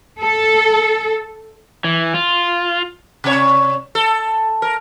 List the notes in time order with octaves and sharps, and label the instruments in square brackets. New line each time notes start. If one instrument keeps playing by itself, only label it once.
[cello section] A4
[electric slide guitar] E3
F4
[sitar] C3 C#5
A4
A#4